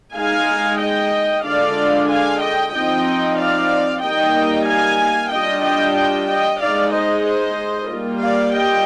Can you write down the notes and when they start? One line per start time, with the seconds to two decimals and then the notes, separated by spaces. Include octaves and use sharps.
0.15 G#3 D#4 F5 G#5
0.79 D#5 G5
1.44 D3 G#3 D4 F4 D5 F5
2.08 F5 G#5
2.40 D#5 G5
2.73 F3 C4 D#4 D#5 G5
3.37 D5 F5
4.02 G3 A#3 D#4 D#5 G5
4.67 F5 G#5
5.31 G3 D4 F4 D#5 G5
5.63 D#5 G5
5.95 D#5 G5
6.27 D#5 G5
6.59 G#3 D#4 D5 F5
6.92 C5 D#5
7.24 C5 D#5
7.89 G3 A#3 F4
8.21 D5 F5
8.54 D#5 G5